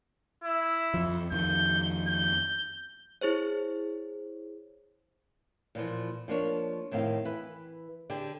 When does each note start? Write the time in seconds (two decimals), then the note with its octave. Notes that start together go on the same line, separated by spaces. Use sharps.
0.44 E4
0.94 F2 F3
1.32 F2 D#3 G6
2.08 G6
3.21 E4 G#4 C5 C#5
5.75 A#2 E3 F3
6.28 F3 A#3 D4 C#5
6.91 F2 A2 D#3 C4 F5
7.25 E3 B4
8.10 D3 G4 G#4